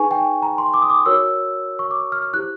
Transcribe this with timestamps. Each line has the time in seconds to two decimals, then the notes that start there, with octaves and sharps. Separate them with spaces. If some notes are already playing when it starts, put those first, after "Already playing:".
Already playing: D#4 G#4 B4 G#5 C#6
0.11 G5
0.42 A#5
0.58 C6
0.74 D6
0.82 D#6
0.90 D6
1.06 F#4 A#4 C#5 E6
1.79 C#6
1.91 D6
2.12 F6
2.22 F6
2.34 E4 G4 C5 F#6